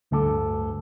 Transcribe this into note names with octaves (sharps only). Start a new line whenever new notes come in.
D1 D2 G2 A4 D6